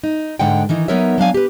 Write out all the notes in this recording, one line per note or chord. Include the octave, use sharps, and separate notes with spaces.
D#4
G#2 D3 G#3 F#5 G5
D#3 E3 D#4
F#3 B3 D#4 A#4 C#5 E5
F#3 D4 F5 G#5
G4 B4